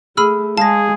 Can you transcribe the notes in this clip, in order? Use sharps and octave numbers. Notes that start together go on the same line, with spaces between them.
A3 G#4 B5 E6 F6
G#3 G#4 F5 A5 A#6